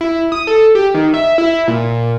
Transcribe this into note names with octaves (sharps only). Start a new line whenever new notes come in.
E4
D#6
A4
G4
D#3
E5
E4
A#2